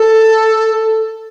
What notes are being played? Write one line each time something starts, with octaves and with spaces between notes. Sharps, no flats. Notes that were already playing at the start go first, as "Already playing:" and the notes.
Already playing: A4